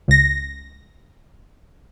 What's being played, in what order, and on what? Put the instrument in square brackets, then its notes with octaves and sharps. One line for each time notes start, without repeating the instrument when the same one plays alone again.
[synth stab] C#2 A#6